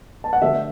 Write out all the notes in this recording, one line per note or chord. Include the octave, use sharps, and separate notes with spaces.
A5
F#5
D3 A3 D4 E5